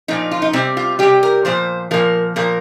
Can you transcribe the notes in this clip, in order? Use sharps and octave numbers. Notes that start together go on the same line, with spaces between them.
A#2 F3 D#4
F4
D#4
C3 G3 C4
F4
C3 G3 G4
A#4
A#2 F3 C5
A#2 F3 A#4
A#2 F3 A#4